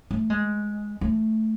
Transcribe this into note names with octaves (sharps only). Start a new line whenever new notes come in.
A3
G#3
A3